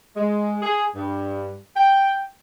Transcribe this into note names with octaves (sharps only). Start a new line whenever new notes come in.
G#3
G#4
G2
G5